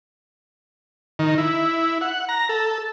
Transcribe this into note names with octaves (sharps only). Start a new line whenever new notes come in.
D#3
E4
F#5
A#5
A4